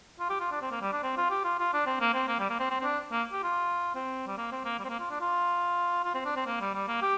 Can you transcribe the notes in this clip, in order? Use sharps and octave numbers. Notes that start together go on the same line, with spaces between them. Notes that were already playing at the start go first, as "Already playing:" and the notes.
F4
G4
F4
D4
C4
A#3
G3
D4
C4
F4
G4
F4
F4
D4
C4
A#3
C4
A#3
G3
A#3
C4
C4
C4
D4
A#3
G4
F4
C4
G3
A#3
C4
A#3
G3
C4
A#3
F4
D4
F4
F4
C4
D4
C4
A#3
G3
G3
A#3
G4